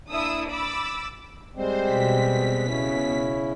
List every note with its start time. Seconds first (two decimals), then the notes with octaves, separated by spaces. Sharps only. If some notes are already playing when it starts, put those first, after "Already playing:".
0.10 A#3 D4 E4 D#6 E6
0.49 B5 D6 E6 A6
1.55 G3 G#3 C4 C5
1.84 B2 B6
2.66 C#3 C#4 E4